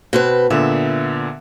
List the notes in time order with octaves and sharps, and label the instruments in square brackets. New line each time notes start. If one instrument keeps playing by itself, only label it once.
[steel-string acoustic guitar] B2 C4 B4
[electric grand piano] A#2 D3 B3 [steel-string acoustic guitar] E5